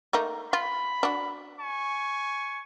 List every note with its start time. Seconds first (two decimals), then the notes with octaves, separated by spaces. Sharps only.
0.13 A3 A#3 D#4
0.53 F4 B5
1.03 D4 F#4
1.59 G#5 C#6